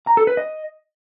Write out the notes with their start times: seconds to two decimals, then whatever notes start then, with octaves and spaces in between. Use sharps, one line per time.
0.07 A#5
0.17 A4
0.27 B4
0.37 D#5